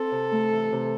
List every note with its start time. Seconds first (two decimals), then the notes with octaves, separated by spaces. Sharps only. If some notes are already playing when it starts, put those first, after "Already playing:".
Already playing: C4 A4
0.12 C3
0.32 A3
0.52 E3
0.72 C3